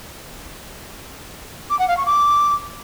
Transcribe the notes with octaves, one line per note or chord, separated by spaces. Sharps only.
D6
F#5
F5
C#6
D6